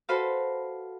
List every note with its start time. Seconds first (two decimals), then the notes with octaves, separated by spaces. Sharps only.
0.09 F#4 A4 B4 C5 F5